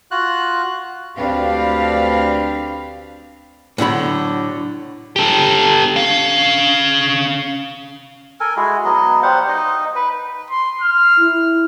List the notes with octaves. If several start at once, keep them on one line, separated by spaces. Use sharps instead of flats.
F4 F#4 F#6
D2 C4 D4 G4 B4 F5
A2 D3 F#3 B5
G4 A4
C#4 F5
A4 A#4 G#5
G#3 E4 F#4 G#4
F#3 B3 D#5
G3 C5 F5 F#5
D#4 D#5
B4
C6
F6
E4